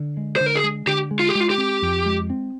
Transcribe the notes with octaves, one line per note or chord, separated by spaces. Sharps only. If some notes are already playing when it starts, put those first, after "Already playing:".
Already playing: D3
G#3
D3 C5
A#4
G#4
G#3
D3 G4
G#3
F4
G4
G#3
F4
G4
C4
F2
G#3
C4